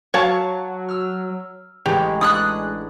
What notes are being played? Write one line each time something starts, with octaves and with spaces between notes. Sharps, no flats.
F#3 C#5 F5 A5
E6 F6
A1 G#3 G4
D4 D#6 E6 F#6